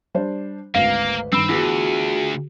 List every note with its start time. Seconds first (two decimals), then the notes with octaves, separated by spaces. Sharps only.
0.14 G3 D4 C5
0.75 G#1 D2 A#3 B4 F5
1.33 G2 D#3 C4 B5 E6
1.49 D2 E3 B3 F4 F#4 G#4